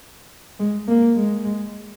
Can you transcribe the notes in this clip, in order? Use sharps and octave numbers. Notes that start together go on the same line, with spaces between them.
G#3
A#3
G#3